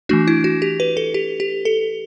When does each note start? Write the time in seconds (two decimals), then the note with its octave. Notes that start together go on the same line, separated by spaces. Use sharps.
0.09 E3 A3 D4 F#4
0.28 E4
0.44 F#4
0.62 G4
0.80 B4
0.97 A4
1.14 G4
1.40 G4
1.65 A4